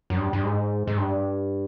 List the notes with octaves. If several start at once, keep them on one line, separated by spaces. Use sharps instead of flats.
F#2
G2
G2
G#2
G#2
G2